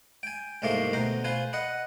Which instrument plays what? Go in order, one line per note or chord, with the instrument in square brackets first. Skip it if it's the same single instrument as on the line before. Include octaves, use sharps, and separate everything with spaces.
[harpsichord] G5 G#5
C2 G#2 A3 A#3 G4 F5
D2 B2 C5 A#5
F4 B4 C5 G#5
B4 D#5 F#5